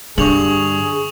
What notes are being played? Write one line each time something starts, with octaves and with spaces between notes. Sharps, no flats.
G2 D3 G#4 C#6 F7 F#7